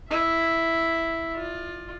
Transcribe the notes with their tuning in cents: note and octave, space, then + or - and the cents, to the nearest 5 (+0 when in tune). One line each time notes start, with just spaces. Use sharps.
E4 +0 E5 +0
F4 +15 D5 +35